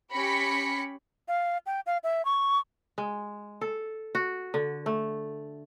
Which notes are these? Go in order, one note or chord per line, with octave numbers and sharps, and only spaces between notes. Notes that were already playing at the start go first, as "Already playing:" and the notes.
C#4 G4 B5 A#6 B6 C#7
F5
G5
F5
E5
C#6
G#3
A4
F#4
D3
A3